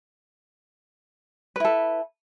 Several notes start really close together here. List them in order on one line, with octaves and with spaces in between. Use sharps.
B4 E4 A4